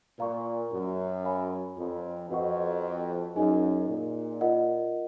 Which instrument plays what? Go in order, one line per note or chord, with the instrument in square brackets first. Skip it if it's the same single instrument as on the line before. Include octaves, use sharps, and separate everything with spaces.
[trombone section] A#2 [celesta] A#4 F5 A#5 C#6
[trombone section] F#2
[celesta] C#5 F5 G#5 B5
[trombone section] F2
[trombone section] F2 [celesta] F#4 B4 D#5 F#5 C#6
[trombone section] F#2 [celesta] D#4 G#4 D#5 G#5
[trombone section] A#2
[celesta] F4 A#4 D#5 F#5